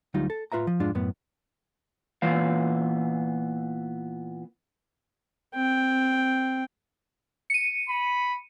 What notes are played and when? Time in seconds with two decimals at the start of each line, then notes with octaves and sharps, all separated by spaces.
0.14 D2 F#3 G3 D#4 F4
0.30 A4
0.52 A2 F4 B4 E5 A#5
0.67 F3
0.80 F2 G#2 G#3 D4 F4
0.95 F#2 A2 B3
2.22 A#2 E3 B3 F5
5.55 C4 G5
7.50 C#7 D#7
7.89 B5